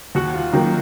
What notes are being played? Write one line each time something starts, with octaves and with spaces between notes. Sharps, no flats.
D#2 F#4
F4
D#3 F#3 A#3 D#4